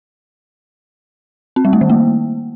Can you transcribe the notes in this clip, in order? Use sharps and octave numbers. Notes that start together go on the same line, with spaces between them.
C4
G3
A3
D#3
A#3